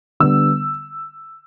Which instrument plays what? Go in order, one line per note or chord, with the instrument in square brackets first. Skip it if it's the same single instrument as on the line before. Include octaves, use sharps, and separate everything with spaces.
[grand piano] D3 G3 B3 E6